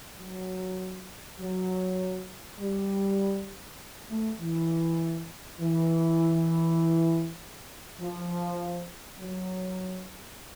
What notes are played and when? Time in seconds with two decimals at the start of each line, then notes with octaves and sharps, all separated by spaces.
0.19 F#3
1.39 F#3
2.59 G3
4.09 A3
4.40 E3
5.60 E3
8.00 F3
9.20 F#3